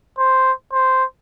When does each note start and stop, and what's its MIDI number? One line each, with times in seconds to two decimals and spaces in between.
0.18 0.52 72
0.72 1.04 72